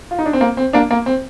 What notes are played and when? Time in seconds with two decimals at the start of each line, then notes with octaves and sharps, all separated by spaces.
0.11 F4
0.19 D#4
0.26 D4
0.33 C4
0.41 A#3
0.57 C4
0.73 A#3 D4
0.91 A#3
1.06 C4